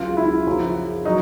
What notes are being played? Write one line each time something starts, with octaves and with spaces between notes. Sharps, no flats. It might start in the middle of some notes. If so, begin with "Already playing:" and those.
Already playing: C#2 C#3 F#3 F4
E4
F#2 C#3 F3
F#3 D#4